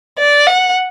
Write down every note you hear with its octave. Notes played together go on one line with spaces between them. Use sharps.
D5
F#5